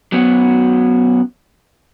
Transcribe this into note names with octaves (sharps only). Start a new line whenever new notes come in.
F#3 B3 C#4 F#4